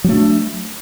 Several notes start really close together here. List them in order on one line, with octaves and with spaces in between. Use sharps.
F#3 A3 D4